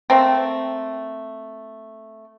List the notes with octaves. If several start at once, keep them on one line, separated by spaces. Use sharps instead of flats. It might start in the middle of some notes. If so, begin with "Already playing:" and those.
A3 A#3 C4